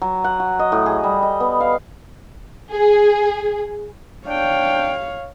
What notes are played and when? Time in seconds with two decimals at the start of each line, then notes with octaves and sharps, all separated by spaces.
0.02 F#3
0.24 F#5
0.40 F#4
0.59 D#5
0.72 A2
0.86 G#4
1.04 G3
1.22 D#5
1.40 B3
1.61 F5
2.69 G#4
4.27 D4 C#5 F5 G5